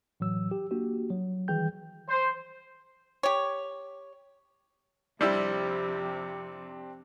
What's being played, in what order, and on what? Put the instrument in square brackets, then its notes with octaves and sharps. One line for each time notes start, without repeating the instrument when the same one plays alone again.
[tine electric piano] A2 E3 F#3 E6
G4
A#3 D4 F#4 G4
F#3
D#3 E3 G3 G#4 G5 G6
[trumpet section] C5
[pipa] G4 C#5
[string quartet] F2 C3 [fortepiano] G3 E4 [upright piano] C4 D4 G4